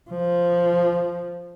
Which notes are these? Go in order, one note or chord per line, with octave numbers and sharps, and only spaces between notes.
F3